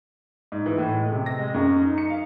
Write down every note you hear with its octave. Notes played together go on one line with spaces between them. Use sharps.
G#2
E3
A2
G#3
C3
A#6
G#3
F#2
D#4
C#7
F5